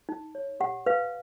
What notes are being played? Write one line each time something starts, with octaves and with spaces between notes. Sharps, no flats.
D#4
C#5
G4 F#5
B4 F5